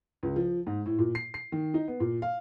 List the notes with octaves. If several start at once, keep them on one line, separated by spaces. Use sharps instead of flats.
C#2
F3
G#2
A2
A#2
C7
C7
D#3
D#4
B3
A#2
F5